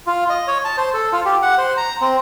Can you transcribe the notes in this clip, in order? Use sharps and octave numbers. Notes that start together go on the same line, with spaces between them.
F4
D#5
C#5
A5
C5
A4
F4
G4
F#5
C5
A#5
C4